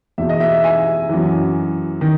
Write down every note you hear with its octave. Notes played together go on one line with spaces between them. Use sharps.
E2 B2 E5
D#5
E5
G#5
F#2 E3
D#3